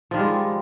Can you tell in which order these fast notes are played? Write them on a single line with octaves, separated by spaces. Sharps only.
F3 D#3 G3 G#3